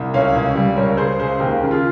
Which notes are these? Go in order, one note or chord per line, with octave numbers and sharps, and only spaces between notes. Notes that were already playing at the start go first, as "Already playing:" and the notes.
Already playing: C2
C#2 C#5 F5
C#2
G3
C#2 A#4 C#5
C#2 G#4 C5
C#2 G#4 C5
D#2 G4 A#4
C#3
F4 G#4